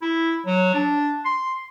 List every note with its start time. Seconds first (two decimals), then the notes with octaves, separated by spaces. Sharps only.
0.02 E4
0.47 F#3
0.74 D4
1.25 C6